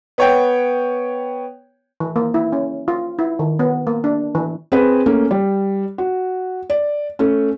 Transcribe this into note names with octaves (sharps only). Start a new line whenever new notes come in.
B3 C#5 G5
E3
A#3
E4
C#4
F4
E4
D#3
B3
A#3
D4
E3
C4 G#4 B4
A3 A#3 C#4
G3
F#4
D5
A3 C#4